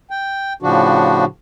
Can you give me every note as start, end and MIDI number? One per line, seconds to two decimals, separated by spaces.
0.11 0.53 79
0.63 1.25 45
0.63 1.25 49
0.63 1.25 53
0.63 1.25 62
0.63 1.25 66